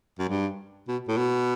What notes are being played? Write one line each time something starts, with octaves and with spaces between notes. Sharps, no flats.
F#2
G2
B2
A2
B2